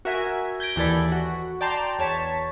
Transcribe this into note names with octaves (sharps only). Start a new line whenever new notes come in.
F#4 A#4 E5 G#5
G6 G#6 A#6 D7
D#2 E3 A4 D5 B5
F#4
D5 G5 A5 A#5 C6
E2 C#5 A5 B6